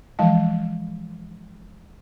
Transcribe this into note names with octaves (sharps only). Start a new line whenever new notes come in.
E3 F3 G#3 F5 A5